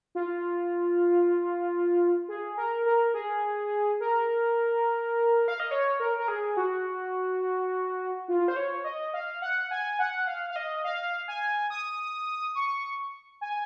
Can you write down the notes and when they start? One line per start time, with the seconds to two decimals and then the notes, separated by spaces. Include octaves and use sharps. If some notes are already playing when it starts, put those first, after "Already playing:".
0.15 F4
2.29 G#4
2.57 A#4
2.86 A#4
3.14 G#4
4.00 A#4
5.48 F5
5.60 D#5
5.71 C#5
6.00 A#4
6.19 A#4
6.28 G#4
6.57 F#4
8.28 F4
8.48 C5
8.56 C#5
8.84 D#5
9.14 F5
9.42 F#5
9.71 G#5
9.99 F#5
10.27 F5
10.50 F5
10.56 D#5
10.84 F5
11.28 G#5
11.70 D#6
12.55 C#6
13.41 G#5